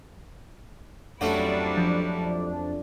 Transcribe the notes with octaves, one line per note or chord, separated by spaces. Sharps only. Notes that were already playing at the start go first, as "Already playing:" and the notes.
F2 F#3 G3 A3 C#4 D4 E4 F#4
F3